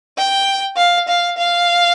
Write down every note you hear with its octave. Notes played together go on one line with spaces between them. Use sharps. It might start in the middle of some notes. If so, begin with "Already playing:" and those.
G5
F5
F5
F5